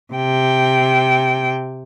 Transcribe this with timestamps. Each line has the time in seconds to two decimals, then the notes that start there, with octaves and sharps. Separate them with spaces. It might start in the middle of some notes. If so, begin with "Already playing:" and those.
0.13 C3 G5